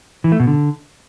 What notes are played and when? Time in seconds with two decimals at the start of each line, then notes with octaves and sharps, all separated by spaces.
0.24 E3
0.32 A3
0.40 B2
0.47 D3